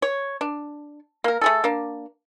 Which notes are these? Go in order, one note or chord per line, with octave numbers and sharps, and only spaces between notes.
C#5
D4
A#3 A#4
A3 G#4 A4
A#3 D4